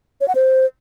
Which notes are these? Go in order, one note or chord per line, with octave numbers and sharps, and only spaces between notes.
C#5
F#5
C5